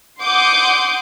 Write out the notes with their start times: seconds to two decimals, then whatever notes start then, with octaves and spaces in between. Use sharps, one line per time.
0.21 F#5 C6 D6 D#6 G6